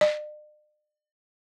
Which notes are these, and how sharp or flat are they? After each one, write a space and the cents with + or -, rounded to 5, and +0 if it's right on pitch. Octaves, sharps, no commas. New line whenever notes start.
D5 +45